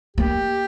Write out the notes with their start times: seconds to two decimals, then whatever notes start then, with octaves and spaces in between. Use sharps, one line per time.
0.17 A#3 G4